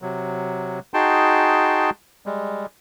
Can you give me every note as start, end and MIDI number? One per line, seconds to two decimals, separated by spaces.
0.02 0.79 48
0.02 0.79 54
0.94 1.90 63
0.94 1.90 66
0.94 1.90 68
0.94 1.90 79
0.94 1.90 81
0.94 1.90 84
2.26 2.66 55
2.26 2.66 56